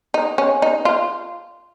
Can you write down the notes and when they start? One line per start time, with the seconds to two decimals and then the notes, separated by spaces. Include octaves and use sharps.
0.14 D#4
0.38 C#4
0.62 D#4
0.85 F4